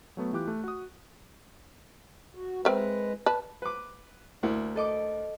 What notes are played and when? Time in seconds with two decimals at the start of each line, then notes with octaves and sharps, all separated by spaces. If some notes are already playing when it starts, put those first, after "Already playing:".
0.17 F#3 A3 B3
0.33 E3 F4 G4 D6 F#6
0.47 A3
0.64 F#4 D#6
2.35 F#4
2.65 G#3 C4 A#4 B4 E5
3.26 B4 A5
3.62 B4 D6
4.43 D2 A#3 E4
4.76 A4 D#5 D6